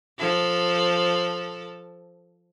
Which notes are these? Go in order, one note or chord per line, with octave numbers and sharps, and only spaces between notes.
F3 A4